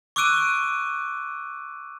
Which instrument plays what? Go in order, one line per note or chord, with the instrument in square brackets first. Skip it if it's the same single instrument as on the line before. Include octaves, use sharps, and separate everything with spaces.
[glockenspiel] C#6 D6 E6 F#6 D7 D#7